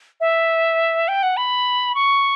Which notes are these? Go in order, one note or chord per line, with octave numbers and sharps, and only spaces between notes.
E5
G5
F#5
B5
C#6